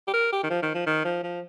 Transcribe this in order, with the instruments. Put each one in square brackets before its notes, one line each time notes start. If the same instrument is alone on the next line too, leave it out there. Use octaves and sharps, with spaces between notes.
[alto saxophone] G4
A#4
G4
D#3
F3
D#3
F3
D#3
F3
F3